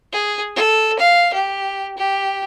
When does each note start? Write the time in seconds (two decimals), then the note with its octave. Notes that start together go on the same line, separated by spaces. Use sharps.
0.12 G#4
0.56 A4
0.99 F5
1.34 G4
1.98 G4